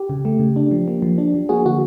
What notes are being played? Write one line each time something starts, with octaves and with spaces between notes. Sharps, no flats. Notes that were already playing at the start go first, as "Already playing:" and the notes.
Already playing: G4
C#3
A3
C#3
D4
F3
A#3
F3
D4
F3
A#3 F#4 G#4
D3 F#4